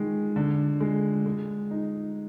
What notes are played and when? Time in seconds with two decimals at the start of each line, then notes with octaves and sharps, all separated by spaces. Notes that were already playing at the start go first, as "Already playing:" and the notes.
Already playing: D#3 G#3
0.36 D3
0.80 G#3
1.26 G#3
1.71 D#4